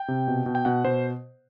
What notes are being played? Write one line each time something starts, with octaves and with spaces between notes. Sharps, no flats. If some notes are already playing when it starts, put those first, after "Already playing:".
Already playing: G5
C3
B2
B2
G5
B2 F#5
B2 C5